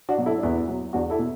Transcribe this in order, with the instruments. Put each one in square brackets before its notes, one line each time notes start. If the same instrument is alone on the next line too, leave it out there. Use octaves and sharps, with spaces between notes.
[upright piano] D4 F#4
B2 F#3
E4 A4
D4
E2 B3 E4
B2 F#3
E2 D4 F#4
E4 A4
B2